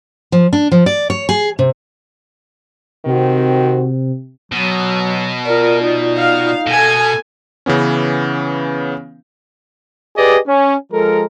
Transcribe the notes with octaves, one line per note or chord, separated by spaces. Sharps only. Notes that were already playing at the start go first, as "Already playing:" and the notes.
F3
D4
F3
D5
C#5
G#4
C3
C3 D#3 C4 F#4
B2 F#3
F4 A#4 D5
D#4
F5
B2 A4 G#5
C#3 E3 B3 C#4
G4 G#4 B4 D5 D#5
C#4
F3 G#3 A4 A#4